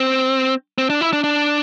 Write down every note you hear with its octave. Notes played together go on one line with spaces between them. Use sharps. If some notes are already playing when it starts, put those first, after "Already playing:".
Already playing: C4
C4
D4
E4
D4
D4